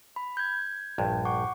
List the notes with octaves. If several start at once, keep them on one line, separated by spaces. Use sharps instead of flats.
B5
G6 G#6
A#1 G2
F#5 C#6 D6